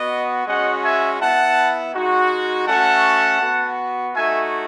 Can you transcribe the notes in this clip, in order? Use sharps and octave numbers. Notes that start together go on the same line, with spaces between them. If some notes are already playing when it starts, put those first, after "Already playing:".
Already playing: B3 F#4 D#5
G#3 C#4 F#4 D#5 F#5
E5 G#5
B3 E4 F#5 A5
G#3 D#4 F#4
A3 C#4 F#4 F#5 A5
B3 F#4
A3 D#4 F#4 E5 G#5